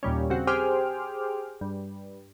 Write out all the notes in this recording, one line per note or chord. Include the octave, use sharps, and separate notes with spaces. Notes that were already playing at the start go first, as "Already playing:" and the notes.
D#2 A#2 G3 C#4
C#3 C4 F#4
G4 G#4 C5 G5 D6 F6
G2